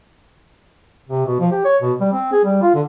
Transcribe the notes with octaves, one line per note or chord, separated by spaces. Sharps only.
C3
B2
F3
G4
C#5
B2
G3
C4
G#4
G3
F4
D3